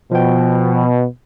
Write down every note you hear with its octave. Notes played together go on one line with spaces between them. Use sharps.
B2 F3 G5